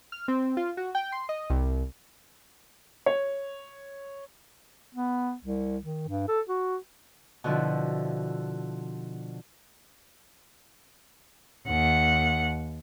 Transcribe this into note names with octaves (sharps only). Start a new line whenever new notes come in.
F6
C4
F4
F#4
G5
C6
D#5
C2
C#5
B3
C2
D#3
G2
A4
F#4
B2 D3 F3 E4
D#2 F#5